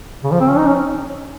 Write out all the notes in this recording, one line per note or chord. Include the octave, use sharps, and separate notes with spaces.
C#3
F3
C4
C#4
D#4
C#4